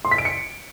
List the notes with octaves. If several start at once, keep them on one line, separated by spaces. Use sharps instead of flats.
C6
B6
D7
C#7